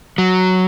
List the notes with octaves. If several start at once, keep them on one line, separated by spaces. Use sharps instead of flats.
F#3